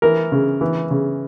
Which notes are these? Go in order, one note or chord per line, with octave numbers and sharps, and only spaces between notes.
E3 A#4
C#3
E3
C#3